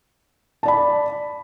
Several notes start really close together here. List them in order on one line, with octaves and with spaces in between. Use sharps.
A5 D5 B5